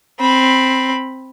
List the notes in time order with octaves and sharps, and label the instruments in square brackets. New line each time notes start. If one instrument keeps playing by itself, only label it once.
[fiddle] C4 B5